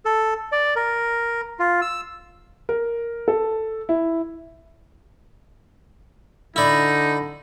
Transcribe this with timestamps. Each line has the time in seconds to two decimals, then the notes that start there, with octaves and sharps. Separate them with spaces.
0.05 A4
0.52 D5
0.76 A#4
1.59 F4
1.82 E6
2.69 A#4
3.28 A4
3.89 E4
6.56 D3 D#4 E4 D5